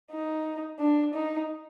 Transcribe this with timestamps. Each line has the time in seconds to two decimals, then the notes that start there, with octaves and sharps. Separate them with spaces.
0.11 D#4
0.80 D4
1.14 D#4